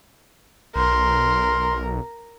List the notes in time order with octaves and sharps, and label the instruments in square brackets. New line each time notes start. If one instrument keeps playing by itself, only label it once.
[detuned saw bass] B1 [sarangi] A#4 [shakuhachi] C6